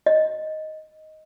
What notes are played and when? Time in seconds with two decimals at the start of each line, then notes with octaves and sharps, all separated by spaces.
0.06 D#5